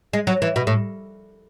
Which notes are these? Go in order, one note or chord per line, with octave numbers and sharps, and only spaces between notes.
G#3
F#3
E3
B2
A2